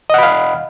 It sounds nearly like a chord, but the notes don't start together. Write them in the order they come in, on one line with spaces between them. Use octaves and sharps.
D#5 F#5 B5 F5